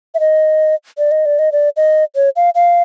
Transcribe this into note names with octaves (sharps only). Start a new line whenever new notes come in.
E5
D#5
D5
D#5
D5
D#5
D5
D#5
C#5
F5
F5